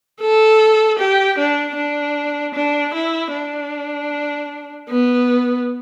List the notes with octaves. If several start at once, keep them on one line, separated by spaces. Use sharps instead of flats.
A4
G4
D4
D4
D4
E4
D4
B3